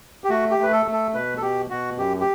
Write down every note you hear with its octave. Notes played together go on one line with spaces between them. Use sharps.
G4
A3 F#4
G4
A3 B4
A4
A3
A4
B2 B4
A4
B2 G4
B2 F#4
F#2 G4
G4